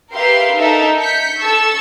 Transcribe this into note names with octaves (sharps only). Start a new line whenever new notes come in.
G4 A#4 B4 E5 F5 C6
D#4 A4 A#4 E5
G6 B6 C#7
A4 A5 C#6 E6